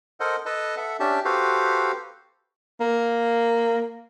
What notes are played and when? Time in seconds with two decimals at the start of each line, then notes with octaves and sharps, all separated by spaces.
0.20 A4 A#4 C5 D#5 F#5
0.46 A4 B4 D#5 A5
0.77 A4 E5 F#5
1.00 C#4 D4 G4 E5 A5
1.25 F#4 G4 A4 B4 C5 F5
2.80 A#3